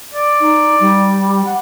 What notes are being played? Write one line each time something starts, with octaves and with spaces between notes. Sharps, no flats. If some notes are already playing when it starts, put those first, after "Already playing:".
D5
D#4
G3
F#5